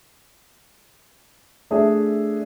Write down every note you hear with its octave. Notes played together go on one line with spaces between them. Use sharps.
A3 D4 G#4 C#5 E5